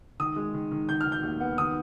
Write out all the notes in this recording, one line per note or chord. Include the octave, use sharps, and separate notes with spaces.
D#3 D#6
G#3
D#3
D#3
D#3 G6
F6
D#3
G6
D#2
B3
D#3 D#6